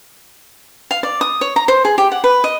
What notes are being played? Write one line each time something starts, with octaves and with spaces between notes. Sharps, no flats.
F5
D5
D#6
C#5
A#5
C5
G#4
G4
F#5
B4
D#5